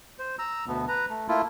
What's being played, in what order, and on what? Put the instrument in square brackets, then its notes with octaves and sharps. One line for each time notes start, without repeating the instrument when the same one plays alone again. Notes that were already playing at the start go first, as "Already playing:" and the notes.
[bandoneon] C5
A#5 E6
D2 B2 A3 B3
B4 A#5
A3
A3 A#3 E4 F4